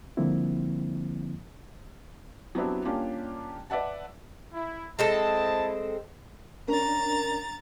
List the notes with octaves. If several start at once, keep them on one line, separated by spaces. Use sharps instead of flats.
D3 F3 G3 A#3 C4 E4
F#3 B3 C4 D4 E4 G4
G3 A#3 C#4 D4 F4 G4
B4 D5 E5 F#5 A5
E4
G#3 C4 E4 A4 D#5 A5
C#4 D4 A#4 A#5 A6